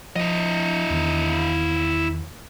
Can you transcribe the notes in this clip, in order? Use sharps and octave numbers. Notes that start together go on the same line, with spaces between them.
F3 E4 D#5
E2 D#3